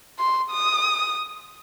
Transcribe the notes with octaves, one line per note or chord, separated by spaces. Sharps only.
C6
D#6